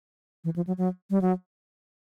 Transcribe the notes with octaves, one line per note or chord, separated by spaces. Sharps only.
E3
F3
F#3
F#3
G3
F#3